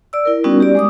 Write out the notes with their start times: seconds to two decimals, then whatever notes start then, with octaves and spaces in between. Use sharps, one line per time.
0.13 D5 E6
0.25 E4 A#4
0.44 G3 B3 C#4 D#4 F#4 A#4
0.60 G4 D5
0.75 G#3 D6 D#6